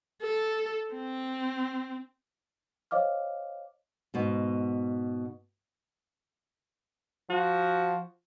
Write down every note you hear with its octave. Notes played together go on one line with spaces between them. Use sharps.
A4
C4
C5 C#5 D#5 F5 D6 F6
G#2 B2
F3 F#4